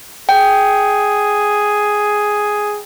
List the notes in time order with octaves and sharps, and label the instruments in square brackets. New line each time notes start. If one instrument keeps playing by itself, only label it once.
[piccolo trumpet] G#4 [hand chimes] G5